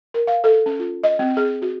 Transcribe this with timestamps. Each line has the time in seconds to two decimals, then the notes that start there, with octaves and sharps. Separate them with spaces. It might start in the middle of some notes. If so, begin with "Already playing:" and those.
0.14 A#4
0.27 F5
0.44 A4
0.66 C#4
0.79 F4
1.04 D#5
1.19 C4
1.37 G#4
1.62 F#4